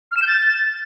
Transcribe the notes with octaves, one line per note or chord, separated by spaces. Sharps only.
F6
E7
G6
A6